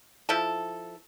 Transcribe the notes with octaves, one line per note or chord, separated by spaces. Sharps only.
F3 E4 A4